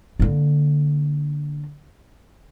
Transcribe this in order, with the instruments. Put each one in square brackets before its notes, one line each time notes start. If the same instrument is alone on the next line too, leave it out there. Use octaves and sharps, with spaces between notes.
[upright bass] D3 A#3